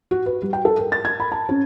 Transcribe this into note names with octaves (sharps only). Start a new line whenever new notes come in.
F#4
B4
G3
G5
A4
A#4
A6
G#6
B5
A5
C#4